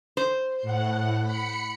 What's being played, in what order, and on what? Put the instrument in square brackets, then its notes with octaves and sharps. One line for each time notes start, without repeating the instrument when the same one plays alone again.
[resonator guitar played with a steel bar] C5
[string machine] A2 F#5
B5 C#7